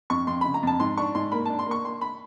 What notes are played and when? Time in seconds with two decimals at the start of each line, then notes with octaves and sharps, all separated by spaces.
0.10 F2 C#6
0.27 F2 C6
0.41 C#3 B5
0.54 A#5
0.63 F2 A5
0.80 G#2 C6
0.97 D4 C#6
1.15 G#2 C6
1.32 A#3 B5
1.46 D4 A5
1.59 C6
1.66 A#3 C#6
1.84 A#3 C6
2.01 B5